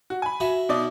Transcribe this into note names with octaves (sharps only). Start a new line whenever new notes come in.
F#4
G#5 B5
F#4 E5
B2 D#4 D5